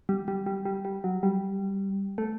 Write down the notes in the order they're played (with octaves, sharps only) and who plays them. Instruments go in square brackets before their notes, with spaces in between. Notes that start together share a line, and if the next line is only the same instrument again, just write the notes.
[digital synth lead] G3
G3
G3
G3
G3
F#3
G3
A3